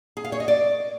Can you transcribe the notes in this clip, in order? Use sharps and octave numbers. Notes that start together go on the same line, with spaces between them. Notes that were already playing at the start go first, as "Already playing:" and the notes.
G#4
F5
C#5
D#5
D5